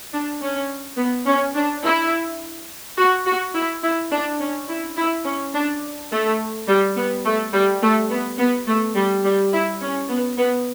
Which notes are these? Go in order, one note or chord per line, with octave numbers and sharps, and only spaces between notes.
D4
C#4
B3
C#4
D4
E4
F#4
F#4
E4
E4
D4
C#4
E4
E4
C#4
D4
A3
G3
B3
A3
G3
A3
B3
B3
A3
G3
G3
E4
C#4
B3
B3